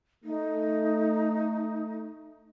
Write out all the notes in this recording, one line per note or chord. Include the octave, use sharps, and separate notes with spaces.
A3 D#4